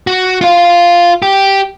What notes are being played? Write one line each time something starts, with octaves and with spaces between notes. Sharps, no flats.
F#4
F4 F5
G4